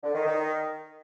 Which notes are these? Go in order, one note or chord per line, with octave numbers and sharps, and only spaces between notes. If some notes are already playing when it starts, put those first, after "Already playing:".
D3
D#3
D#3